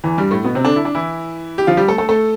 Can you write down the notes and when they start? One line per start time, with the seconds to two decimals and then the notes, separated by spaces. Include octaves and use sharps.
0.04 E2 E3
0.18 G2 G3
0.31 A2 A3
0.44 B2 B3
0.55 C3 C4
0.65 D3 D4
0.76 E4
0.85 D4
0.95 E3 E4
1.58 G4
1.67 F3 F4
1.77 G3 G4
1.88 A3 A4
1.98 A3 A4
2.09 A3 A4